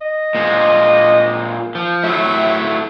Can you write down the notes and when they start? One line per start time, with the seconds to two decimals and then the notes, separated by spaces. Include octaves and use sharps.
0.01 D#5
0.35 A#2 G#3
1.75 F3
2.04 A2 F#3 A3 E5